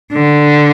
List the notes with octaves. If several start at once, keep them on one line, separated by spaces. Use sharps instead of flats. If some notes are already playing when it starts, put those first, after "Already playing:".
D3